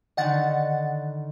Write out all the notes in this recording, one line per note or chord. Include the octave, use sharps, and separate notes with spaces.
D3 D#3 D#5 F#5 A6